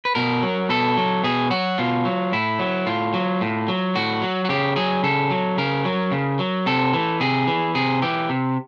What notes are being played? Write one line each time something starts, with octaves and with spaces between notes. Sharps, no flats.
B4
B2 A#4
F#3
B2 A4
F#3
B2 G#4
F#3 F#4
B2 F4
F#3
A2 E4
F#3
A2 F4
F#3
A2
F#3
A2 F#4
F#3
F#4
C#3 G4
F#3 G#4
C#3 A4
F#3
C#3 A#4
F#3
C#3
F#3
C3 A4
E3
C3 G#4
E3
C3 G#4
E3 G4
C3